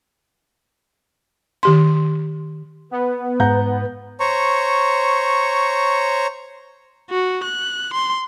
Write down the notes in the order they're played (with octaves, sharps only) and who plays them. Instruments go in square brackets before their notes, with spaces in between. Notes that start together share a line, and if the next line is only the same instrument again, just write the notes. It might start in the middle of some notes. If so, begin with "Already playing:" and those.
[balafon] D#3 G4 C6
[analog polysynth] B3 [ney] B4
[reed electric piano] G#2 [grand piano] F#5 A#5 G6
[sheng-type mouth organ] C5 C#5 A#5 C#6
[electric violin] F#4
F#6
C6